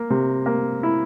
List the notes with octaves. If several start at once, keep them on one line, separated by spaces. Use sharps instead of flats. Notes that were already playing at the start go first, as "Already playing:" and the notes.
Already playing: A#3
C3
A#3
E4